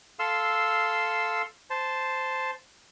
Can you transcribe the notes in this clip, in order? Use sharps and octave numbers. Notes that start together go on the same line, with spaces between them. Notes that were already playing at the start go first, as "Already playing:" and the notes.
A4 F5 C6 E6
C5 A5